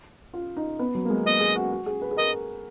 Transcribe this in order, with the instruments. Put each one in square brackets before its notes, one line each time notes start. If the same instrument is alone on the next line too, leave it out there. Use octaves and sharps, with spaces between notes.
[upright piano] F4
D#4
B3
F#3
A#3
G#3
[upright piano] B3 [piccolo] D#5
[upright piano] G#4
F#4
F#4
G#4
B4
G#4
[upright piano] A#4 [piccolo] D#5